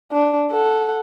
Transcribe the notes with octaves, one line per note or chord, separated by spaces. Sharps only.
D4
A4 F#5